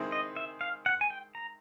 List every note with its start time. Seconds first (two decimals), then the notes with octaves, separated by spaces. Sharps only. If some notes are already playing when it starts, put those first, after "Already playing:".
Already playing: D#3 G#3 C4 E4 G#4
0.12 D#5
0.36 E5
0.61 F5
0.86 F#5
1.01 G#5
1.10 G5
1.35 A#5